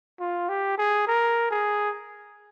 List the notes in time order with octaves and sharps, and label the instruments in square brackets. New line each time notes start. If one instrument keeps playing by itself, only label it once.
[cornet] F4
G4
G#4
A#4
G#4